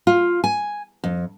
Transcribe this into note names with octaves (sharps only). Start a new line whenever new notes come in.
F4
G#5
F2